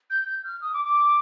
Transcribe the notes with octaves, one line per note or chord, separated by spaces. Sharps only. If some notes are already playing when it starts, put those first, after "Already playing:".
G6
G6
F6
D#6
D6
D6